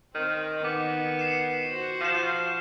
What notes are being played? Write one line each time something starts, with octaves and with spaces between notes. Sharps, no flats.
D#3 C4
D#3 B3 D6
C7 C#7 E7
F#4 C5
F3 D#7 E7